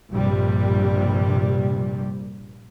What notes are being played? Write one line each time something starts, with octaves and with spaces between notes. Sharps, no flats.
A#1 G2 C3 G3